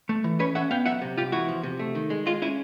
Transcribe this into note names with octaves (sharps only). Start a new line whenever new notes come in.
A3
E3
C#4 B4 C#5
C#4 E5 F#5
B3 F5 G5
F#3 E5 F#5
C3
C2 F4 G4
E2 E4 F#4
F3
C3
A3
D#3
G#3
G#3 F4
C#4 E4